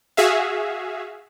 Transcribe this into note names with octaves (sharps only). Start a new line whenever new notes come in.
F#4 G#4 E5 F5